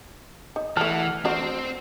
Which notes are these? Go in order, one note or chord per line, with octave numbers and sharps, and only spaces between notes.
D#4
E3 A3 F#5 A5 F6
D3 A3 C4 F#4